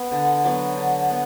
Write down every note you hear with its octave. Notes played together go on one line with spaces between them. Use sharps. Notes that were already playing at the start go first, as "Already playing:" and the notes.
Already playing: B3 E5 F#5
D3
F#3 B3
D3
B3